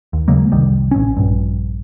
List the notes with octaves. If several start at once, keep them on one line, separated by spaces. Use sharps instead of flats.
D#2
C#3 F#3 G#3 A#3
F1 C2 D#3 G3
A1 C#4
A#1 G2